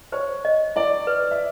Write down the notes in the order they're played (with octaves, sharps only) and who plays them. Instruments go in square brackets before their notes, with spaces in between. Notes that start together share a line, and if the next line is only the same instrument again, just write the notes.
[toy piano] C5 [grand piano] C#5
[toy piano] D#5
[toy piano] E4 [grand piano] D5
[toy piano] B4
[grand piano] E5